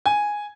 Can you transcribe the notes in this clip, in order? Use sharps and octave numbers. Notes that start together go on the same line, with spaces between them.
G#5